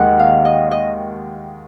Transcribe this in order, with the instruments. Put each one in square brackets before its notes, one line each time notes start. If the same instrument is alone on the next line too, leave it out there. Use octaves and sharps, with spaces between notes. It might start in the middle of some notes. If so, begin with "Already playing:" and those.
Already playing: [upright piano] D#2 D#3 G#3 [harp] D#5 F#5
[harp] F5
D#5
D#5